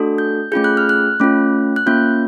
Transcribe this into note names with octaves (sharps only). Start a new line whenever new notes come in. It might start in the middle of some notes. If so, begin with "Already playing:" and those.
Already playing: A3 D4 F#4 A4
G6
A3 C#4 F4 G#4 G6
F#6
F6
F#6
A3 C#4 F4
F#6
A#3 C#4 F4 G6